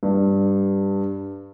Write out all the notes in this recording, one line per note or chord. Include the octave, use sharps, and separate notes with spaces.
G2